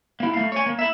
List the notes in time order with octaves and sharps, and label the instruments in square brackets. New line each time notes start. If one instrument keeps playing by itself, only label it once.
[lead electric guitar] A#3 E4
A3 F5
C#5 G#5
A#3
E4 E5